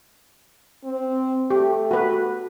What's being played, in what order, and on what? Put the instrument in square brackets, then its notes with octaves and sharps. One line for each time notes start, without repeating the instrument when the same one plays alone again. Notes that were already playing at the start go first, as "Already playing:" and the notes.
[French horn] C4
[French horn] A3 [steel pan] G4
[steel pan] F#4 B4